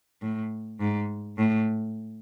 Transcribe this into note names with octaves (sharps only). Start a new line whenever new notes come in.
A2
G#2
A2